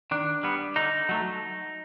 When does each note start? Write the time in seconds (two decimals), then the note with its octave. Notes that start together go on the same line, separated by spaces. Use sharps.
0.11 D#3 D4
0.43 G3 B3
0.76 D3 D#4
1.09 F#3 A3